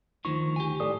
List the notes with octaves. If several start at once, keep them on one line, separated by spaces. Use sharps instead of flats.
D2 D#3 F3 C#6
G4 G#5
A2 A4 D5 D#6